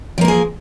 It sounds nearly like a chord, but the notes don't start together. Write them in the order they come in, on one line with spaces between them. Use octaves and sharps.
F3 A#3 A#4 G#4